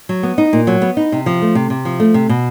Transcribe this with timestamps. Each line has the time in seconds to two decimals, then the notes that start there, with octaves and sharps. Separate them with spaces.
0.09 F#3
0.23 B3
0.38 D#4
0.53 A#2
0.67 F#3
0.82 B3
0.97 D#4
1.12 C3
1.26 F3
1.42 A3
1.55 C3
1.70 C3
1.85 F3
2.00 A3
2.14 C3
2.29 B2